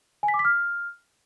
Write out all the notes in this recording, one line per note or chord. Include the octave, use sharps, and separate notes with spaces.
G#5
B6
D6
B6
F6